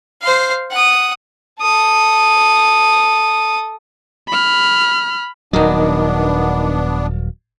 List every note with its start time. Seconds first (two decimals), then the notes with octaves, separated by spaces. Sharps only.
0.22 C5 F5
0.71 F#5 D#6
1.61 A4 D#6
4.28 B5 F6
5.53 D#1 F#3 B3 D4 D#4 A#4 D#5